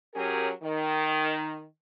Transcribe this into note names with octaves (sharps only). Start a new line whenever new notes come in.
F#3 C#4 G4 G#4 A#4
D#3